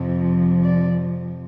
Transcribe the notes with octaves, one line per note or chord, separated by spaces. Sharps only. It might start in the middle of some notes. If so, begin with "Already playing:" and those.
Already playing: F2 C3 F3
D5